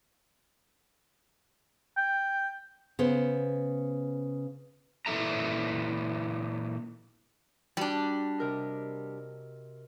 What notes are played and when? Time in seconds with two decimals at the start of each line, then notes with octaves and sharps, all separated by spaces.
1.97 G5
2.99 C#3 B3 C5
5.06 A#2 E3 D#4 A4 E5 A#5
7.77 G3 D4 F#4
8.38 C3 A#4 D#5